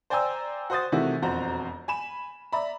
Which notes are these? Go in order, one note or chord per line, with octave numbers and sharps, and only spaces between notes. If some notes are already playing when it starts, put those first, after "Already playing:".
C5 D5 G5 G#5 A#5 E6
F#4 C5 D#6 A6
C3 D#3 E3 A3 E4 F#4
E1 F2 F#4 C5 A#5
G#5 B5 E7
D5 E5 A#5 B5